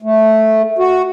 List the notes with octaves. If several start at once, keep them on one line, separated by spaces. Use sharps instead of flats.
A3
F#4